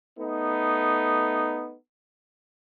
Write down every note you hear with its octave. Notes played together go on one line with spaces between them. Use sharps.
A3 B3 D#4